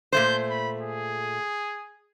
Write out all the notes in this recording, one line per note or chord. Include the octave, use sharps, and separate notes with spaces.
A#2 A3 C5 G6
B5
G#4